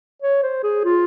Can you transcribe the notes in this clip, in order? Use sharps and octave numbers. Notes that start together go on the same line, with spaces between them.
C#5
C5
G#4
F4